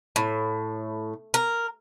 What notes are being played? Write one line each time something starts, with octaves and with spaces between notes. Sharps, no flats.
A2
A#4